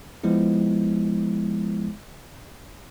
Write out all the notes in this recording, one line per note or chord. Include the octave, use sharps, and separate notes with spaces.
F3 G#3 B3 E4